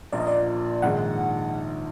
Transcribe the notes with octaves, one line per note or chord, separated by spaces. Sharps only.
A#1 A#2 F3 A#3 D5
D#5
D5
A#1 G#2 D#3 G#3 F#5